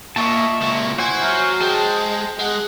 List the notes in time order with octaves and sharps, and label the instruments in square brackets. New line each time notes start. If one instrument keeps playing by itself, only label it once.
[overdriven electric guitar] A#2 [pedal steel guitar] D#5 E5 A5 [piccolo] C#6
[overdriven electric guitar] C#2 A#2
[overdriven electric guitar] E4 [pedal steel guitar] F#4 C5 G#5
[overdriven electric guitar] F#3 [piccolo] F6
[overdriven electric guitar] G#3 [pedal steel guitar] C5 A5 [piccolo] G5
[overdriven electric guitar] G#3 [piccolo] F#5